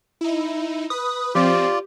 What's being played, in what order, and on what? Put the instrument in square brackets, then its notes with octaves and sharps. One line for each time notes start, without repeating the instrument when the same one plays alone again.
[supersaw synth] D#4 E4
[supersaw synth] B4 [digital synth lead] D#6
[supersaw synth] F3 C4 [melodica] F4 D5 [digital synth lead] G4